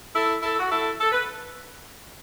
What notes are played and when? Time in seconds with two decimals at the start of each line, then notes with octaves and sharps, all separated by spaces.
0.14 E4 A4
0.42 E4 A4
0.59 F#4
0.70 E4 A4
0.99 A4
1.11 B4